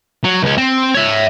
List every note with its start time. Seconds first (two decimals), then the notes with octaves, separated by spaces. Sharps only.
0.24 F#3
0.42 C#2 C#4
0.58 C4
0.94 C#5 E5